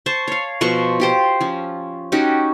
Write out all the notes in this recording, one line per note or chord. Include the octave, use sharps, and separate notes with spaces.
C5 A5 C6 C#6
C#5 F5
B2 F3 C5 C#6
F4 G4 C5
F3 C#4
C#4 D#4 F#4 G4